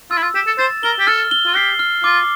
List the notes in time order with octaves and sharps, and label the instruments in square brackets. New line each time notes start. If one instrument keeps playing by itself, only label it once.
[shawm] F4 [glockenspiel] E6
[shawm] E4
F4
[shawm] G4 [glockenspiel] E7
[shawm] A4
[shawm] C5 [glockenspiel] A6
[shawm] A#4 [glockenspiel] G7
[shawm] G4
[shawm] A4 [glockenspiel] F6
[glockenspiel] G7
[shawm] F4
[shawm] G4 [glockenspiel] C7
[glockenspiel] F6
[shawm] F4 [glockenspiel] D6